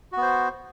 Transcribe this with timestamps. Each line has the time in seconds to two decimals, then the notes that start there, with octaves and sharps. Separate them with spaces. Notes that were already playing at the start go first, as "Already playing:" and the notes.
0.12 F#4
0.17 B3
0.22 C5